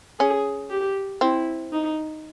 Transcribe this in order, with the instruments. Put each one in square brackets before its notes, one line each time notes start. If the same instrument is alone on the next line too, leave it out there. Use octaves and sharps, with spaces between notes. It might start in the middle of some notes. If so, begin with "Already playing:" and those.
[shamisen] C#4 [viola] G#4
[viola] G4
[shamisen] C4 [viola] E4
[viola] D#4